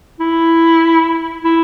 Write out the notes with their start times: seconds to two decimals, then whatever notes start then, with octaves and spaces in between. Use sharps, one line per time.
0.20 E4
1.44 E4